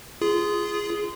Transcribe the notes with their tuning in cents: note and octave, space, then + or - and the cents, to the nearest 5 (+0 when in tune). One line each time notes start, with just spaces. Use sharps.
F4 -20 G#4 +0